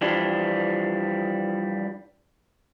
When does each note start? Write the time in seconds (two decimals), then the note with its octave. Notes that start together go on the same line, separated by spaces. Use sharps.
0.01 E3 F3 G3 D4